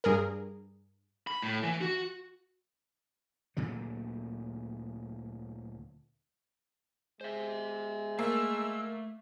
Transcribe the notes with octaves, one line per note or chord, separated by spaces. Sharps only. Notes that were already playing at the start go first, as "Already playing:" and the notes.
G2 G#4 A#4
B5
A2
E3
F#4
D2 A#2 D3 F#3
G#3 C5 E5
A3 A#3 E6